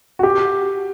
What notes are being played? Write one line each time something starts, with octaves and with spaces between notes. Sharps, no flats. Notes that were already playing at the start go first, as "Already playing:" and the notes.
F#4
G4